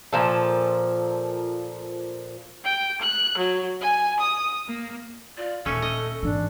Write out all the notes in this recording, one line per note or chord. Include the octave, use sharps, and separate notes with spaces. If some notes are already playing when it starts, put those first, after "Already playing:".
A#2 F3 A4
G5
F#6
F#3
G#5
D#6
A#3
F4 D5
D#1 A3 C#4 A4
D#5
G#1 E3 D4